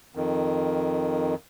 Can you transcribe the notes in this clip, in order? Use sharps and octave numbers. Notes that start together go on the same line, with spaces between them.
F2 D#3